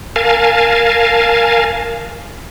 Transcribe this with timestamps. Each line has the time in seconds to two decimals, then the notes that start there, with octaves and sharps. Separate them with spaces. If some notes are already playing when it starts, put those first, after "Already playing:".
0.16 A#4 F5 G#5 A5